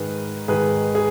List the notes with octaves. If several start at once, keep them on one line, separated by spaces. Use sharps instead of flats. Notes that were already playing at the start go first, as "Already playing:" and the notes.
Already playing: G#2 D#3 G#4 B4
G#2 D#3 G#4 B4
G#4